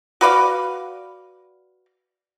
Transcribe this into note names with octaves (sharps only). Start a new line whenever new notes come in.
F#4 B4 D5 F5